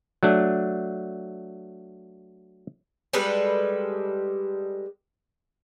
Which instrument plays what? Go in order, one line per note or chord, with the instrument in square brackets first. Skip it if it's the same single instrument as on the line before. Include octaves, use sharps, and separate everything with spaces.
[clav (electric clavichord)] F#3 A3 D4
[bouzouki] G3 G#3 A4 B4